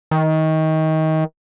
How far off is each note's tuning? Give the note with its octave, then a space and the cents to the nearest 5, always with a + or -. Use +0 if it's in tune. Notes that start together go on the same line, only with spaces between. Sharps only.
D#3 +25